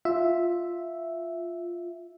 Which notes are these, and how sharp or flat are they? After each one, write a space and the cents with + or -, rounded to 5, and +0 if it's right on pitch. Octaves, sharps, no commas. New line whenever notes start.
F4 +0 E5 +0